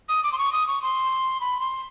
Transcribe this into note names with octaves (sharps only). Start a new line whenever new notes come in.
D#6
D6
C6
C#6
D#6
C#6
C6
B5
C6